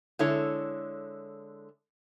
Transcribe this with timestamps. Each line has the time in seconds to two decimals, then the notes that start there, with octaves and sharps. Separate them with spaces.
0.19 D3 G#3 E4 A4 C#5